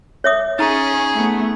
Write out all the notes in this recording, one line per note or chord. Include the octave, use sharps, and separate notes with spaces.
C#5 E5 D#6
C#4 D#4 G#4 A#5
A3 B3